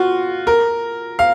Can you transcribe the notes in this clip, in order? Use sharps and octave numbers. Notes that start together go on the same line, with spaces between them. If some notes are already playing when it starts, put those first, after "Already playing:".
Already playing: F4 F#4
A#4
F5